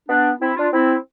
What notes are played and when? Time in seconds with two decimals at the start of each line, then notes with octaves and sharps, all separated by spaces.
0.09 B3 D4
0.41 C4 E4
0.57 D4 F4
0.73 C4 E4